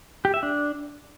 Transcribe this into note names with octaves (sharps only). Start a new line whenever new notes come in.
G4
E5
D4